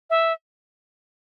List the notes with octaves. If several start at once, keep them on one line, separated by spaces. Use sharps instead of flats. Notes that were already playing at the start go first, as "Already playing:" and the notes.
E5